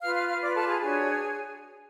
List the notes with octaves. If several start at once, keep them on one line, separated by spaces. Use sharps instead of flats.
F4 B4 F5 F6
F5 F6
F5 F6
F4 B4 D5 D6
A4 A5
G#4 G#5
D4 F#4 G#4 C#5 G#5